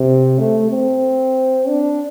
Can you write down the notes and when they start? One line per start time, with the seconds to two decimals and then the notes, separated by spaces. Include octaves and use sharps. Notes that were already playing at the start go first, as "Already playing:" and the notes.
Already playing: C3
0.39 A3
0.71 C4
1.68 D4